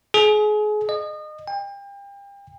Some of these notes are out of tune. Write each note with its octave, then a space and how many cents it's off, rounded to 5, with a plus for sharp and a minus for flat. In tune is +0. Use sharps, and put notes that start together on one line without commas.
G#4 +30
D#5 -30
G5 +35